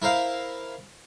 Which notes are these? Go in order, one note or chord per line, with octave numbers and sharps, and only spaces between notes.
E4 A#4 C5 F5